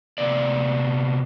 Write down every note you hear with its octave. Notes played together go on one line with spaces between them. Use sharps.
C3 B3 D5